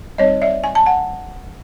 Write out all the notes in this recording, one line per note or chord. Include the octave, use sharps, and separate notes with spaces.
G3 C4 D#4 C#5 D#5
D5 E5
G#5
A5
F#5 G#5